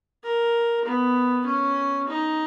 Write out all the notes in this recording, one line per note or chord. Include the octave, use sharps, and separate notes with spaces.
A#4
B3
C#4
D#4